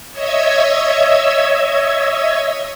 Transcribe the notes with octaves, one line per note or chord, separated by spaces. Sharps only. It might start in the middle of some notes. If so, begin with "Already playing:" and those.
C#5 D#5 E5 E6 G#6